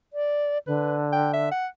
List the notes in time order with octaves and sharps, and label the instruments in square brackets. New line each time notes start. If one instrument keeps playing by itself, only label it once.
[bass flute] D5
[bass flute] D3 [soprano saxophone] B4
[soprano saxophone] G5
E5
F#5